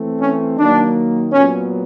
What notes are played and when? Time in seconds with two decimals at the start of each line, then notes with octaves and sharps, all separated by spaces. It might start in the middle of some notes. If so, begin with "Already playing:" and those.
Already playing: E3 A3 C4
0.20 C#4
0.58 D#3 F#3 A#3 D4
1.33 A#2 F#3 B3 C#4